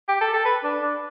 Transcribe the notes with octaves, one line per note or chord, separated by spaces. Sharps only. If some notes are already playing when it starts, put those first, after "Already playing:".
G4
A4
A4
B4
D4
D4